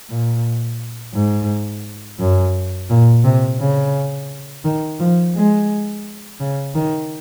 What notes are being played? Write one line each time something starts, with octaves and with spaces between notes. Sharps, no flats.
A#2
G#2
F#2
A#2
C3
C#3
D#3
F3
G#3
C#3
D#3